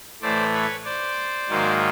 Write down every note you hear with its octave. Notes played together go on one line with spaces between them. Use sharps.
A2 E3 A3 C5 D5
B4 C#5
C5 D5
G#2 D#3 F#3 A#3